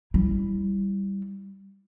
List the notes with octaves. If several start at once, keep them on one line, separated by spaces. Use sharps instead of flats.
G3 E4